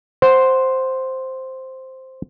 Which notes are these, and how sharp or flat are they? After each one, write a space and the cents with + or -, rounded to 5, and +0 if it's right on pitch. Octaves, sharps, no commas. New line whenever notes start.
C5 +0 F#5 +0